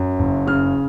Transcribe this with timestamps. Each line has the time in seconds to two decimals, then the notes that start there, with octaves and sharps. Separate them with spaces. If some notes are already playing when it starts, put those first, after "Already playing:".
Already playing: F#2
0.19 F#1
0.47 C#3 F6